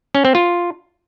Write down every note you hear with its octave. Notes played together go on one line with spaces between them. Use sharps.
C#4
C4
F4